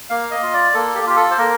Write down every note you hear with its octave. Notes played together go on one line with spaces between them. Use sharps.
A#3 F5
D#5
F4
D5
A#3 A4
G4
F4 G4
A4
C5
A#3 A#4